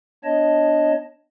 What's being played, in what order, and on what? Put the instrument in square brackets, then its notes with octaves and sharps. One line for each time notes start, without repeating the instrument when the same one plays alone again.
[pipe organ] B3 D4 C#5 D#5 A5